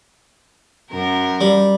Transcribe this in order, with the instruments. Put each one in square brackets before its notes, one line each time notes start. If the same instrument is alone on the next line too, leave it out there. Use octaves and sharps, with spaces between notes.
[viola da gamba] F#2 A#4
[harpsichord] G3